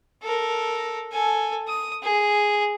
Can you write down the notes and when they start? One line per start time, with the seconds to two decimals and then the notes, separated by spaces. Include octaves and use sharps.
0.23 A4 A#4
1.12 A4 G#5
1.68 D#6
2.03 G#4